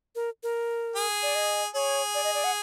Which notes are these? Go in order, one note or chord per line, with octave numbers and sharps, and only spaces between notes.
A#4
A#4
G#4
D5
D#5
G#4 C#5
D5
D#5
D5
F#5